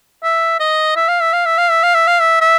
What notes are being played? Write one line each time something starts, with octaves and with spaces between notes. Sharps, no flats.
E5
D#5
E5
F5
E5
F5
E5
F5
E5
F5
E5
F5
E5
E5